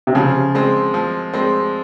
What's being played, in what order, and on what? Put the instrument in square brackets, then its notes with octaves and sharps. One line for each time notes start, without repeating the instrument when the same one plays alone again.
[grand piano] C3
[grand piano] C#3 [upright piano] F3
[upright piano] G#3 C4
F3
G#3 C4